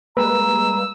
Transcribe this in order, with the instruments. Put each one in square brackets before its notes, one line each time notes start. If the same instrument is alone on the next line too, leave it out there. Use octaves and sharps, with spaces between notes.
[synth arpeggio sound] G3 G#3 A#3 [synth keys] B4 [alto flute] A#5 [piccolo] E6